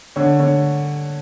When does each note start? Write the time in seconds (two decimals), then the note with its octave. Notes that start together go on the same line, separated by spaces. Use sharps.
0.16 D3 C#5
0.39 D3 C#5